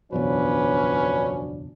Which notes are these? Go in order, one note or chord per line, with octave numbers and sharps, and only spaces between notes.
F#1 B1 E2 F3 F#3 C#4 D4 B4